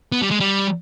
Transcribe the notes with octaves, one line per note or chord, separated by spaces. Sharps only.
B3
G3
G#3
G3